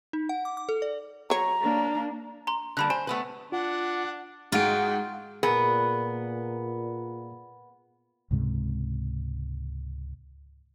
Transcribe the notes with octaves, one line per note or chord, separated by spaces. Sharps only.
D#4
F#5
D6
D6
A4
D5
F#3 C#5 A#5
A#3 D4
A#5 C6
D3 G3 A#3 A5 B5 F#6
C5 G#5 E7
A3 B3 B4
D4 F4 F#5
G#2 G#3 F4 F#4 G#4 G5 D7
A#2 B3 G#4 A#4
C#2 G#2 C3 G#3